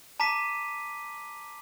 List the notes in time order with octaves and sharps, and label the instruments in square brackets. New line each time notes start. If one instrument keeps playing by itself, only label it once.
[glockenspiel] A5 A#5 D6 B6 D#7